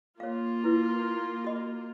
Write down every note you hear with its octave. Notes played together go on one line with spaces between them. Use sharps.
A#3 F4 C#5 F5
E4 B4
F#4 D#5